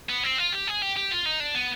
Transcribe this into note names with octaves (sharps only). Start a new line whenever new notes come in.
B3
C4
F4
G4
G#4
G4
G4
F4
D#4
D4
B3